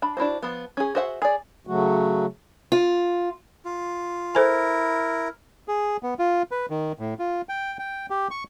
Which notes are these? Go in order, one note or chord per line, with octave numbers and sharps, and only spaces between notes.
D4 B5
D4 E4 F#4 C5
F3 B3
C#4 G#4
F#4 G#4 C5 E5 F#5
G#4 D5
C#3 F#3 A3 F#4
F4
F4
E4 A4 A#4 C5 G#5
G#4
B3
F4
B4
D#3
A2
F4
G5
G5
G4
C#6